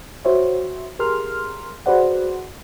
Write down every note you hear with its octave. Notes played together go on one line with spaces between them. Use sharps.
F#4 C5 C#5 E5
G4 G#4 A#4 C6 F6
F#4 G#4 B4 C5 D5 F#5